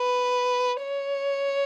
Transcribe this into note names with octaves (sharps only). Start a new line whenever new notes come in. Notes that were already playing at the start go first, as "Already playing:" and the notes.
Already playing: B4
C#5